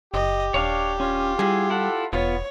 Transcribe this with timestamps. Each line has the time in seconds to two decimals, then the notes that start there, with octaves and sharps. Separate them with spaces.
0.14 F#1 G4 D#5
0.54 D#1 D4 C#5 F5
1.00 C#4 F4
1.39 G3 E4 F#4 G#4
1.70 E4 A4 F#5
2.13 E1 B3 F4 C#5